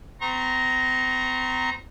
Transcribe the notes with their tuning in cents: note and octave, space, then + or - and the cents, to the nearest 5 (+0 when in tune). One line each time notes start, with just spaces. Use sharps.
C4 -40 A#5 +0 C#6 -45